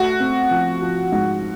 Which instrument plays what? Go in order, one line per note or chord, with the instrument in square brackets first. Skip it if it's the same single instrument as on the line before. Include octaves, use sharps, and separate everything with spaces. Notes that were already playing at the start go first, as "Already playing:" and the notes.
Already playing: [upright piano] A3 [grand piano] F#4
[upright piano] C4
F3
F3
G#2